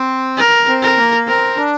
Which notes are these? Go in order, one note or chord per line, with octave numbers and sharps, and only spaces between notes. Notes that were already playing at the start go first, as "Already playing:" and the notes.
Already playing: C4
A#4
C4
A#4
A#3
C4 A#4
D4